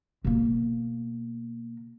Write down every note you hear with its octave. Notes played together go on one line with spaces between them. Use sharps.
B2 A#3